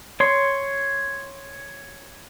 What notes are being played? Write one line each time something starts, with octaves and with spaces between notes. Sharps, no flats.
C#5 C6